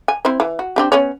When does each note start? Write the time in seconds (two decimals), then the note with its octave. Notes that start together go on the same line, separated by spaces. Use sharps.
0.08 G#5
0.25 C4 E4 C5
0.40 E3
0.59 F#4
0.76 C4 D4 G4
0.92 B3 C#4 C#5